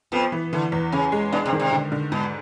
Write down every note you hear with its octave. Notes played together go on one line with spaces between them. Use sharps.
F2 F3 B3
E3
D3 E3
E2
C#3 C#4
G#3
B2 D4
C3
D#3
C3
D3
D3
G#2 B2